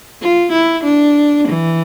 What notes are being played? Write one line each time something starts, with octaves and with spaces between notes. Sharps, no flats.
F4
E4
D4
E3